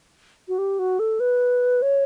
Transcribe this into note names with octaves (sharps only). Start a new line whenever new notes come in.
F#4
G4
F#4
A4
B4
C#5